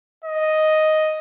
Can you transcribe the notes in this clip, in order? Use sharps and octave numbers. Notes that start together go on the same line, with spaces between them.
D#5